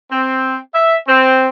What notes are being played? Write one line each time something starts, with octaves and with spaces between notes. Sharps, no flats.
C4
E5
C4